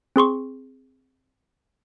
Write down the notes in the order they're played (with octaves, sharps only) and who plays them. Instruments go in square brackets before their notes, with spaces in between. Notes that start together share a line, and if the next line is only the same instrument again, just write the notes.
[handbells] C4 G#4 C6 C#6